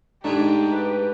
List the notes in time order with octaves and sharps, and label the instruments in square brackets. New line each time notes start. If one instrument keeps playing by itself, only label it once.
[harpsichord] G#2 G#3 A3 [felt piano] D4 [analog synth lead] D#4 [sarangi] G4
[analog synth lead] B4